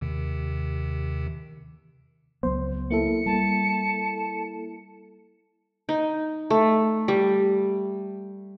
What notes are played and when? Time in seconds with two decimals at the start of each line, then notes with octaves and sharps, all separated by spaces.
0.01 D#2 C3 D#3
2.43 C#2 F#3 B3 C5
2.91 A#3 E4 A4 C#7
3.26 G3 A5
5.89 D#4
6.50 A3
7.08 G3